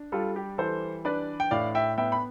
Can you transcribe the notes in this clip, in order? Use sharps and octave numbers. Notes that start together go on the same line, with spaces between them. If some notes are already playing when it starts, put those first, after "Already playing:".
Already playing: D4
G3 F4 A4
G4
E3 A4 C5
D4 B4 D5
G5
A2 D5 F5
E5 G5
B3 E5 G5
B5